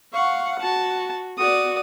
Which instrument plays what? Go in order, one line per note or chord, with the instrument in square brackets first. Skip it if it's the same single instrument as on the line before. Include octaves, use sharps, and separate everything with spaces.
[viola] F5 F#5 [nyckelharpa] C#6
[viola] F#4 [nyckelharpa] A5
[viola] F#4 [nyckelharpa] D5 D#6